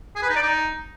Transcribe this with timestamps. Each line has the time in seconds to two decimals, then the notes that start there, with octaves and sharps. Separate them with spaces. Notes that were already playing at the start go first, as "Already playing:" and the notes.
0.16 G#4
0.22 B4
0.29 D#4
0.36 D5
0.43 D#4